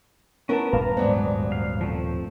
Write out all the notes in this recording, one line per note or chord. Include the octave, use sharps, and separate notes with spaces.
B3 C#4 E4 A#4 A5
D#1 G2 A#3 B4 F5 A5 A#5
G#2 F#3 B3 C5 D5
F5
F3 A3 C4